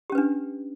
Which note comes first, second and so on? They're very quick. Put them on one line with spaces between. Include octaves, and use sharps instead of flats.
G4 C#4 B4 D4